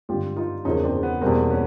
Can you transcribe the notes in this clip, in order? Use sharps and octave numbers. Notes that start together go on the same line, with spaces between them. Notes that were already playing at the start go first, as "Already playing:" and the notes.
G#1 G2 D3 F4 G4
D#4 F4
E2 C#3 F3 A#3 C#4 D#4
C4 D4
B3
E2 B2 G3 A#3 C4
B3 C#4